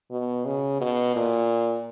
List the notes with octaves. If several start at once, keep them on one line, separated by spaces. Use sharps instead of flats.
B2
C#3
B2
A#2